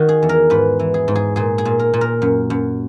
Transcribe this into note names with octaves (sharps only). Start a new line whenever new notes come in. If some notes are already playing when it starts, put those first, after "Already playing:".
Already playing: D#3 F#4
G#4
E2
A#4
G#2 B4
E3
G#4
G#2
G#4
A#2 G#4
G#4
A#2
A#4
A#2
A#4
F#2
F#2